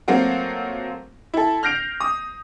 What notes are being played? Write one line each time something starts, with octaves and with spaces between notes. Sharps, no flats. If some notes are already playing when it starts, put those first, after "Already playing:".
F#3 A3 A#3 C4 F4 F#4
E4 A4
F6 G6 A#6 C7 D7 F7
D#6